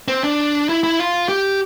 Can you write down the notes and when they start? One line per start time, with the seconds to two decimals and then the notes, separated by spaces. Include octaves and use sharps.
0.08 C4
0.24 D4
0.69 E4
0.83 E4
0.99 F4
1.29 G4